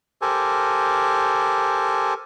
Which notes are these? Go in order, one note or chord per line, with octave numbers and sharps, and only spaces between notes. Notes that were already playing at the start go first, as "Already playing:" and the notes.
G4 A4 A#4 C5 G#5